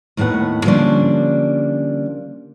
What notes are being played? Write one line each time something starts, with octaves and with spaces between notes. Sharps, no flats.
D#2 A2 B3 C#5 F#5
D3 F3 G3 A#3 C#4 D4